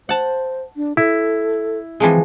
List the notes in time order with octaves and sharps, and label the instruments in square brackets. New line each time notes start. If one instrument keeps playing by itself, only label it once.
[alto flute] C5 [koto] F#5 A5
[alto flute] D4
[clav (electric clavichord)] E4 [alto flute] A4
[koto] E3 F3 G#3 [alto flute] C4